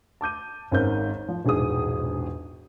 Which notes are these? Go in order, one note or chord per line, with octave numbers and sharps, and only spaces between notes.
A5 D6 G6 D#7
G#1 G#2 C#4 A#4 C5 G6
F3
E1 A#1 G#2 G#4 D#6